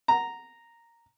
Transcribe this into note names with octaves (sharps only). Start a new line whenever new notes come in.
A#5